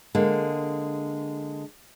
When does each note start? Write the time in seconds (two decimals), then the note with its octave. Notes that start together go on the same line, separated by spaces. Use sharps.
0.15 D3 G#3 A#3